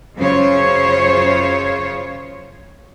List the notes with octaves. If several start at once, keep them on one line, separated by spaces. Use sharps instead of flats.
F#2 C#3 F4 C5 C#5